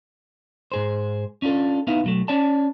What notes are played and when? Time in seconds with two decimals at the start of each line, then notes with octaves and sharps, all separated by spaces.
0.72 G#2 G#4 C5
1.42 C#4 D4 F4 A4
1.87 B3 D#4 E4 B4 F5
2.04 B1 F#3 A3
2.28 C#4 C#5 D5 A5